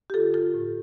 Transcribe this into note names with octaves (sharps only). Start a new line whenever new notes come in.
G4
D3 F4 A4
G2 F4 A4
A2